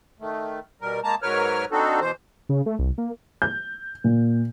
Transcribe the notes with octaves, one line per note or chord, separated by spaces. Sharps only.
D#3 A3
B2 G3 A#4
G#3 A#3 A5 A#5
G#2 F#3 A#4 B4 C#5 F6
C4 D4 D#4 F#4 A4
B2 E3 C5
C#3
A3
C2
A#3
G6
A#2